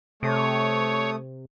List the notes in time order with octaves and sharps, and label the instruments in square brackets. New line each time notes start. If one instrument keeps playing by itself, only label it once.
[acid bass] C3 [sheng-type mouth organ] A3 D#6 [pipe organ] C#5